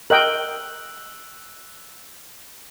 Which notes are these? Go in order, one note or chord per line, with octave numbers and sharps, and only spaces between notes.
A#4 D#5 G5 E6 F#6 F#7